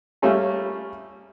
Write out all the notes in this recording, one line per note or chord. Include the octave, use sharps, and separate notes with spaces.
G3 A3 A#3 C#4 F4 G#4